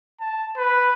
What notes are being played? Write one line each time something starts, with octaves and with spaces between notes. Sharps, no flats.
A5
B4